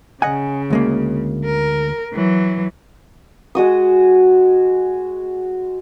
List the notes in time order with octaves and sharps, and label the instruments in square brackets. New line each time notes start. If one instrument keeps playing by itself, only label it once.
[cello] C#3 [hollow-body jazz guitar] D#5 F#5 G#5
[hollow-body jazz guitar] D2 G#3 A#3
[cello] A#4
E3 F#3
[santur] G#3 F#4 D#6